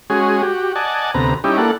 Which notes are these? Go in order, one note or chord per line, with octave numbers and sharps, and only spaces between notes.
G#3 C#4 F#4 G#4
F#4 G4
D5 D#5 F#5 G#5 A5
D2 C3 B3 A#5
G3 C#4 D#4 E4 G4
A#3 D4 E4 A4 F#5